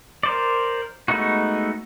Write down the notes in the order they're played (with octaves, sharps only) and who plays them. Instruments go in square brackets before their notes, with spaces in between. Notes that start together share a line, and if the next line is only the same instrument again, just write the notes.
[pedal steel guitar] A#4 C5 D5
G#3 A3 B3 D#4 F#4